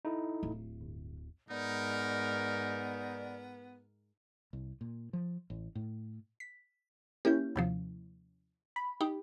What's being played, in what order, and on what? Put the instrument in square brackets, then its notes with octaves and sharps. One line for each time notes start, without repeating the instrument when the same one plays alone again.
[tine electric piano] D#4 E4 A4
[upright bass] D1
[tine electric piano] G1
[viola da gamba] G#2 A#4 [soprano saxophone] B3 [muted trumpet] D#4 [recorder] D5
[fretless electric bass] C2
A#2
F3
A1
A2
[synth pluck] B6
[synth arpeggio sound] A#3 C#4 E4 [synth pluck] G4 G6
[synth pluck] D#2 C3 F3
[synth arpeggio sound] B5
[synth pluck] D#4 [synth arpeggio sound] G4